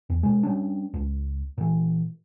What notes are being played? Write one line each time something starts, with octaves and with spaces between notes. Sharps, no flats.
E2
B2 G#3
G3 C#4 D4
C#2
A#2 E3